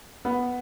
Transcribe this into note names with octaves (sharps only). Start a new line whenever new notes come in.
B3